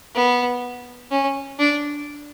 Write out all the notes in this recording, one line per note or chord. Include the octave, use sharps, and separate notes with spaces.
B3
C#4
D4